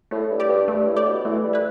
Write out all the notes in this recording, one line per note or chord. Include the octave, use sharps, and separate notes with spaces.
A2 A3
G2
G4 D5
G2
G2 A3
A2
G4 D5
B2
E3 A3
G3
E4 B4